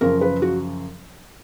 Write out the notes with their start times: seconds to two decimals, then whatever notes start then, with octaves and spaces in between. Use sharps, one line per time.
0.01 F#2 C#3 F3 A#4
0.21 B4
0.42 F#4